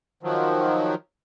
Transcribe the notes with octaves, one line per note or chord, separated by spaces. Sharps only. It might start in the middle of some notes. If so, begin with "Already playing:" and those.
D#3 F3 F#3